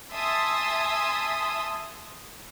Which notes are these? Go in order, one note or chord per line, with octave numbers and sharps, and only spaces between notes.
E5 G#5 A5 C6 D#6 E6